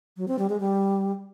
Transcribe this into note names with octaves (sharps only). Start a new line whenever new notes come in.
F#3
C4
G3
G#3
G3